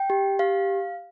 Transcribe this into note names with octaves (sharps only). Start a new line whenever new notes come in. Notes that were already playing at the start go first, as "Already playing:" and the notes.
Already playing: G5
G4
G4 F5